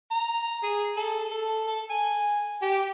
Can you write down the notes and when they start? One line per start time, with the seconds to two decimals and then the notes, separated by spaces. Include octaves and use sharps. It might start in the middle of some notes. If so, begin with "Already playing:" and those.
0.11 A#5
0.63 G#4
0.97 A4
1.31 A4
1.67 A4
1.90 G#5
2.62 G4